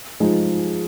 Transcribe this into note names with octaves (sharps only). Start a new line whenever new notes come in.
F3 G#3 D#4